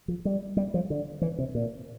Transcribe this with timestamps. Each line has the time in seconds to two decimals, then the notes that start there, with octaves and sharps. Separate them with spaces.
0.08 F3
0.25 G3
0.57 G3
0.74 F3
0.90 D3
1.22 E3
1.39 C3
1.55 A#2